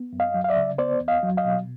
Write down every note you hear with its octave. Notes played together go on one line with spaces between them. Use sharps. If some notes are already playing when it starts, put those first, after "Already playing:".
Already playing: B3
F#2
D#5 F5
F#3
F5
D5 E5
C#3
B3 C5 D5
E2
D#5 F5
F#3
D#5 F5
B2